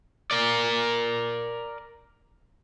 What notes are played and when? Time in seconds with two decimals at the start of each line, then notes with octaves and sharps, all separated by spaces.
0.31 A#4 D5